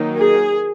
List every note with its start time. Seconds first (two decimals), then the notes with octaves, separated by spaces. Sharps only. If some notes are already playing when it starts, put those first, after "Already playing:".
Already playing: D#3 F#3 A#3 D#4
0.18 G#4